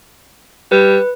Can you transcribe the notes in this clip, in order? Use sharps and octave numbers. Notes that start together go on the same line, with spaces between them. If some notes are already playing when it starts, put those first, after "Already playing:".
G3 B4